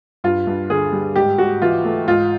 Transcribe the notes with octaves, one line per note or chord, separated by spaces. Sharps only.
G2 F4
G2
D3 G#4
G3
G#2 G4
G#2 F#4
E3 F4
A3
G#2 F4